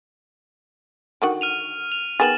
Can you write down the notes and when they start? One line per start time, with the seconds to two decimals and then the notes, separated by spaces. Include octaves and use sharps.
1.22 D3 D#3 F#4
1.41 F6 D#7 F7
1.92 F7
2.20 D#3 B3 G#4 A6 E7 F#7